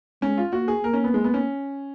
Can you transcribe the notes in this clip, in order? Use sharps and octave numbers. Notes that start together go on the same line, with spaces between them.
G#3 C#4
F4
A#3 F#4
G#4
A#3 A#4
C#4
B3
G#3
B3
C#4